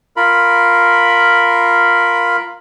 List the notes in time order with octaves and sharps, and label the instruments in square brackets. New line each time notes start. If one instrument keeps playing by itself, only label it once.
[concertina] F4 A#4 B5